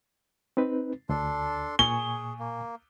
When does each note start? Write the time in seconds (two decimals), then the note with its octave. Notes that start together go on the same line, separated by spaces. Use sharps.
0.57 C4 D#4 B4
1.09 D2 D4 A4 C6
1.79 A#2 G#4 G#5 C#6 G7
2.39 A#3